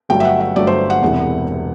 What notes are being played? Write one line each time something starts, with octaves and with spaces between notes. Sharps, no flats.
G1 G2 F#3 A3 G5
E5
F#5
E5
G1 G2 F#3 A3 D5
C5
F#5
E1 E2 C3 E3